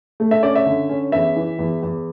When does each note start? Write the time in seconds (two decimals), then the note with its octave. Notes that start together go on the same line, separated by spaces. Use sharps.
0.20 A3
0.31 E5
0.43 C#4 D5
0.55 E5
0.66 D3
0.89 C#4
1.12 E2 E5
1.36 E3
1.59 E2
1.83 E2